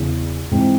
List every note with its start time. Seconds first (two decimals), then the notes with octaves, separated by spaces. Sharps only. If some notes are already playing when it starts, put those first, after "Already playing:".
Already playing: E2 C#3 E3
0.51 G#2 E3 C4